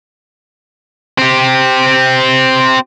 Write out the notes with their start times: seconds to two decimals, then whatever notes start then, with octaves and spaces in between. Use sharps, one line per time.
1.18 C4 G4